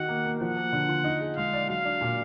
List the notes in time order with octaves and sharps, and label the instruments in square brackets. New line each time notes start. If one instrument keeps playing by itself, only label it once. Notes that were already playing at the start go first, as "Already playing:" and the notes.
Already playing: [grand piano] D#3 D#4 F#4 [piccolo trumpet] F#5
[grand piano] A#3
A#3
[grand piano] F3 [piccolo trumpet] F#5
[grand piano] A#3
D3
F4
D#4
G#4
[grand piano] G#3 [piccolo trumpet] F5
[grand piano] D5
[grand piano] F#3 [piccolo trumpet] F5
[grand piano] D4
A#2